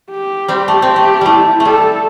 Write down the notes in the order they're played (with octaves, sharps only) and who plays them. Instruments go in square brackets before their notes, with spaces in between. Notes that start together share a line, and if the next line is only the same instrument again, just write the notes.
[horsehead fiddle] G4
[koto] G3 C4
A3
C4
[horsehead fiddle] G4
[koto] A3
[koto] G3 A3 [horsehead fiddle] E4
[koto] A3
[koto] G3 [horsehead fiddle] A4